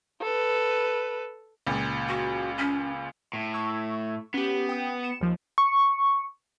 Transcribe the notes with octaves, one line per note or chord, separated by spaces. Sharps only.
A4 B4
C#2 A#2
F#4
C#4
A2
C#6 E6 G#6
B3 C#4 G4
G5 D#6
C#7 E7
D#2 F3
C#6